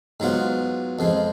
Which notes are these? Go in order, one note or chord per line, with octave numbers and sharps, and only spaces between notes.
G#2 F#3 B3 F4
F2 F3 G#3